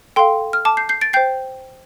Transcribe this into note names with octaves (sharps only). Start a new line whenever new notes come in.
A4 F5 G5 C6
F6
A5 D6
G6 C7
G6 C7
A6 D7
C5 G5 G6 C7